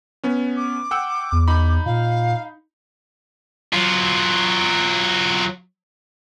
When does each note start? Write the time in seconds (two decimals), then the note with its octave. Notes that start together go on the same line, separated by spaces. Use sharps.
0.24 B3 C#4
0.57 D6
0.91 F#5 G5 E6
1.32 E2
1.48 D#4 B5
1.86 A#2 F5
3.73 F#3 F4